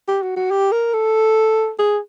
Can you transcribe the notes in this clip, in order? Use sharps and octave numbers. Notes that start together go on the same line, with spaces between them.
G4
F#4
F#4
G4
A#4
A4
G#4